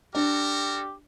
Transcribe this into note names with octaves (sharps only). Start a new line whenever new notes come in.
D4 F#4 G4 A4 A#4